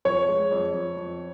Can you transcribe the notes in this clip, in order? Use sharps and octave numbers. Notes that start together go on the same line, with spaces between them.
F2 C#5
G#3
F2
F2
F2